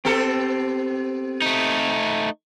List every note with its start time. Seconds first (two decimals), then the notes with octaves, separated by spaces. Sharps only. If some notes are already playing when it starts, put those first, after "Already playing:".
0.05 B3 C4 G4 A4
1.42 A3 D#4